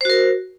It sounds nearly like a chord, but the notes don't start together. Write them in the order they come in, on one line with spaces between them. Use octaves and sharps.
C5 F#4 A#4